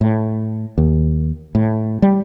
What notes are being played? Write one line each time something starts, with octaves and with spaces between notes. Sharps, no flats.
A2
D#2
A2
G3